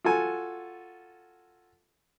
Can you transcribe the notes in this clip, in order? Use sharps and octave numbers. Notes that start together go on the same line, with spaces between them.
F4 F#4 A4 G#5